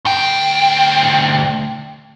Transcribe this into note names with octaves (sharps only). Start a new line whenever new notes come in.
D2 G5